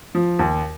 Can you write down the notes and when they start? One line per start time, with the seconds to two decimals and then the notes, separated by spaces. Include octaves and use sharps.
0.15 F3
0.39 D#2